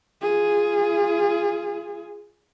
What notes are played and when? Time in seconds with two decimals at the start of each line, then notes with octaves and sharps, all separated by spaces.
0.21 F4 G#4